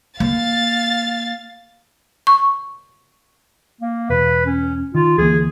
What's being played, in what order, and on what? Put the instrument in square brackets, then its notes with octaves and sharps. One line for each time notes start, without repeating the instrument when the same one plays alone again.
[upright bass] A#3 [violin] F5 A6
[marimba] C#6
[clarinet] A#3
[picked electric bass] E1 [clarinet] B4
[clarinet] C#4
[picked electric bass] D#3 [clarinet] F4
[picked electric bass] D2 E3 A#3 [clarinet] G#4